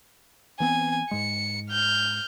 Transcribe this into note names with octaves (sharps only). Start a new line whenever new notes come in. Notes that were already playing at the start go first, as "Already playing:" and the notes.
E3 B3 C4 G#5
G#2 G#3 C#7
F6 G6